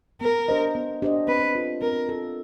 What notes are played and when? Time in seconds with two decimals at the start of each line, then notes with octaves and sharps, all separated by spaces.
0.21 B3 A#4
0.48 D4 G4 C5 D#5
0.75 B3
1.02 D4 G4 C5 D#5
1.28 C4 B4
1.55 F4 A4
1.82 C4 A#4
2.09 F4 A4